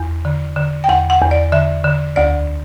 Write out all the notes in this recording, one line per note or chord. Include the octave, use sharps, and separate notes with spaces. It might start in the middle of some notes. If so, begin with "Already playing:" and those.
Already playing: E2
D3
D3
G5
E2 F#5
F#5
E2
D5
D3 E5
D3
D2 D5